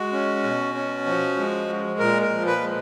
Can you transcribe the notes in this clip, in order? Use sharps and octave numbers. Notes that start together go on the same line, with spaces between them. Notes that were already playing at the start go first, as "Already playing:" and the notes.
Already playing: G#3 F#4
C#4
B2
C#4
F3
G#3
G#3
A#2 A#4
A#4
F3
B4
G#3